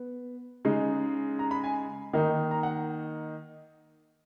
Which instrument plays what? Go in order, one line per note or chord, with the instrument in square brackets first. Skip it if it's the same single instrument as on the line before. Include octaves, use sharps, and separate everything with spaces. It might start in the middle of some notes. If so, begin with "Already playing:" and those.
Already playing: [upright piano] B3
C#3 G#3 D#4
A#5
B5
G#5
D#3 A#3 D#4
A#5
F#5